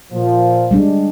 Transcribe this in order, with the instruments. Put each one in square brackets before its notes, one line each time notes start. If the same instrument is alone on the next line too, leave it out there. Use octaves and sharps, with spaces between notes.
[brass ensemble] A#2 F3
[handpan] G3 G#3 D4